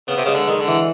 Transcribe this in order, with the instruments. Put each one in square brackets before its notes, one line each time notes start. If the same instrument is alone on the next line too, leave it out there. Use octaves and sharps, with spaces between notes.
[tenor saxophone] C#3 [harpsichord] B3
[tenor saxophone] C3
C#3
[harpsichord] G#3
[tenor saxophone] D3
[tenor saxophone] D#3 [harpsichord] G#3
[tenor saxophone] D3
[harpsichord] E3